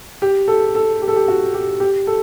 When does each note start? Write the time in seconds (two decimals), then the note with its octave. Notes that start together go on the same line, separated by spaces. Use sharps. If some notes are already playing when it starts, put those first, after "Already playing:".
0.22 G4
0.48 A4
0.75 A4
1.02 G4
1.08 A4
1.16 G4
1.28 F#4
1.54 G4
1.80 G4
2.07 A4